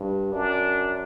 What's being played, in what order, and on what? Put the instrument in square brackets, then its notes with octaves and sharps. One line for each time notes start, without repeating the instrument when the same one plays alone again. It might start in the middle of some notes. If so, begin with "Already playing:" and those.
Already playing: [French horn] G2
[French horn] F#2 [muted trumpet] D4